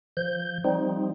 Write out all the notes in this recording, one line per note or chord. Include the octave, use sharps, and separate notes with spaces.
F3 G6
F3 G3 C4 D#4